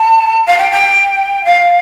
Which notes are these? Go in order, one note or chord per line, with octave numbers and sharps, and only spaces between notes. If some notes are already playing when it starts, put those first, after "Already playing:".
Already playing: A5
F5
G5
G5
F5